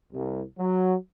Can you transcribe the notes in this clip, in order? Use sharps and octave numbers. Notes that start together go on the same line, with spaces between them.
C2
F#3